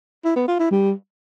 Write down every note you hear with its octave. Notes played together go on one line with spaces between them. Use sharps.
E4
B3
F4
E4
G3